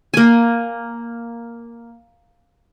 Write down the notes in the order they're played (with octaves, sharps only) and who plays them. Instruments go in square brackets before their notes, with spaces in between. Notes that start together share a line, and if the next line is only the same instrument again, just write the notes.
[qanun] A#3 G#5